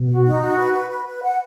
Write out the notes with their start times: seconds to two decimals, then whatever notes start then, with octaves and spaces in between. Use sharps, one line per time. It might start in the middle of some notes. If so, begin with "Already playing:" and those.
Already playing: B2
0.09 F#4
0.25 D#4
0.42 F#4
0.58 B4
0.73 B4
0.90 B4
1.06 B4
1.22 F#5